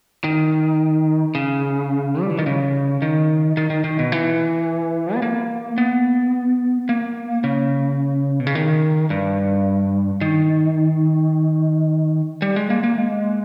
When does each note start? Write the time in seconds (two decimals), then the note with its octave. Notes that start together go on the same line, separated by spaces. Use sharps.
0.24 D#3
1.35 C#3
2.22 G3
2.30 E3
2.39 D#3
2.46 C#3
3.02 D#3
3.57 D#3
3.70 D#3
3.84 D#3
3.99 B2
4.12 E3
5.15 B3
5.22 A#3
5.78 B3
6.89 A#3
7.44 C#3
8.40 B2
8.47 C#3
8.55 D#3
9.10 G2
10.21 D#3
12.42 G3
12.56 G#3
12.70 A#3
12.84 A#3
12.98 G#3